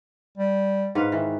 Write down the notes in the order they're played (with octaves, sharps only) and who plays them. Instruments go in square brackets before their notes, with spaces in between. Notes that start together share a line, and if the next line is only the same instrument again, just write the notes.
[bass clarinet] G3
[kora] G#2 B4 F5
[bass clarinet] D#3 [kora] E3